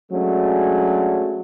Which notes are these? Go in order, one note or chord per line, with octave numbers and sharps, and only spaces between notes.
F#3 G#3 A3 C#4 D4